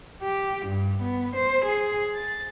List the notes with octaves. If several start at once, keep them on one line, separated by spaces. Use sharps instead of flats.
G4
G2
B3
C5
G#4
A6